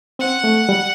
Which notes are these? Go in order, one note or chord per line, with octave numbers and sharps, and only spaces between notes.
C4 F#5
A3
G3